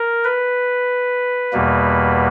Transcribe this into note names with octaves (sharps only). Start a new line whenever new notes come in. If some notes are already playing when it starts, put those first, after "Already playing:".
Already playing: A#4
B4
E2 B2 G3 A#3